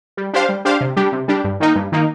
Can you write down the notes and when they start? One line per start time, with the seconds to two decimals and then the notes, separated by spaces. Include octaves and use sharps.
0.17 G3
0.33 D4 G4 C5 F5
0.49 G3
0.65 D4 G4 C5 F5
0.81 C3
0.96 G3 D4 G4
1.12 C3
1.28 G3 D4 G4
1.44 G2
1.60 D#3 A#3 D#4
1.75 G2
1.92 D#3 A#3 D#4